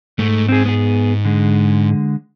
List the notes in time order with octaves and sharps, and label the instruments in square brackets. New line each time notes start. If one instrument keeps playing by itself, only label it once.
[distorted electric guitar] G#2 [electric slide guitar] A3
[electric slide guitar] C4 G#4
B3 G#4
D3 G#3